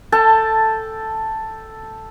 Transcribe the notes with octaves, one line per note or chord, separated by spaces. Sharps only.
A4 G5 A5